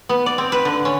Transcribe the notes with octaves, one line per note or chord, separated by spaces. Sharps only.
B3
D5
C4
B4
D3
C#4